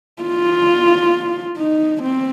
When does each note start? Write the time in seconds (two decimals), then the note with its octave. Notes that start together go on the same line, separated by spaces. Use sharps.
0.22 F4
1.57 D#4
2.02 C4